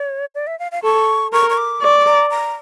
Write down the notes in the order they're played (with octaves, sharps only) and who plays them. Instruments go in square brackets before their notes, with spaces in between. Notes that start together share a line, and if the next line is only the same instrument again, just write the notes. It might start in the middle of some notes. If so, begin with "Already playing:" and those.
Already playing: [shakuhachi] C#5
D5
E5
F5
F5
[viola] A4 [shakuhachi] C#6
[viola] A#4 [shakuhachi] C#6
[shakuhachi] C#6
D6
[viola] D5 [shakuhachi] C#6
[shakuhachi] C#6
A#5
A#5